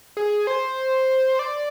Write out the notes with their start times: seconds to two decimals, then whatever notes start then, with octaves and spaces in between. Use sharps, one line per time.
0.17 G#4
0.47 C5
1.39 D5